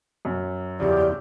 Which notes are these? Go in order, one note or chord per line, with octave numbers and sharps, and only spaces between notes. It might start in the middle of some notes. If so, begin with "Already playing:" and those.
F#2
E2 C#3 F3 G4 D5